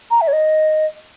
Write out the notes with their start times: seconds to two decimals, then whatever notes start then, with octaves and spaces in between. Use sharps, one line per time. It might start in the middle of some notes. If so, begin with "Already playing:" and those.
0.11 A#5
0.21 E5
0.28 C#5
0.33 D#5